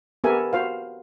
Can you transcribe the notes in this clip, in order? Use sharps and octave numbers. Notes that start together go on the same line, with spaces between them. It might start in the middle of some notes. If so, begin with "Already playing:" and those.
B3 G4 A4 A#4 E5 G#5
F#4 C5 F5